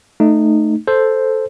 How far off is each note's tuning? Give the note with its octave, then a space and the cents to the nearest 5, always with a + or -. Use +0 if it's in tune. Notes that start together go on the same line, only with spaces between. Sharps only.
A3 +0 D#4 -20
A4 +0 C5 +0